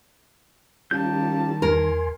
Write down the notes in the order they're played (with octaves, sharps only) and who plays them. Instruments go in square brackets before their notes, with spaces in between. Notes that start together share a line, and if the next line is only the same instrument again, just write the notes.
[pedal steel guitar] D#3 G6 [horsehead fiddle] G3 A5 [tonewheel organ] C#4 F4 G4
[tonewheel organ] E2 G#5 C6 [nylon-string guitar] A#4